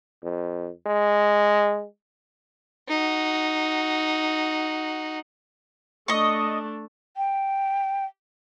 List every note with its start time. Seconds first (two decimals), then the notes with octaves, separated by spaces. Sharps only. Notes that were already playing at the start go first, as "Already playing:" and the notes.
0.23 F2
0.86 G#3
2.89 D#4 F#4
6.08 A3 D4 D#5 C#6
7.17 G5